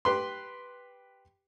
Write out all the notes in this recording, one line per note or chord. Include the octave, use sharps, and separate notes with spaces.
G4 B4 C6